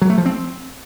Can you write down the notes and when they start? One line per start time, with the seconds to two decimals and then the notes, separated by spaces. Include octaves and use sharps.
0.02 F#3
0.10 A3
0.18 F3
0.26 C4